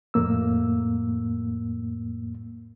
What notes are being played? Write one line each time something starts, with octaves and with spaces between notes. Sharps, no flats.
F2 A2 A#3 E6